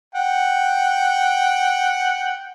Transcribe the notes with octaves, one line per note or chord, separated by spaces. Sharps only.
F#5 G5